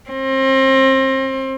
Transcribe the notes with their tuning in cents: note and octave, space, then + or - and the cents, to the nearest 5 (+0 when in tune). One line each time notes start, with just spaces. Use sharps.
C4 +30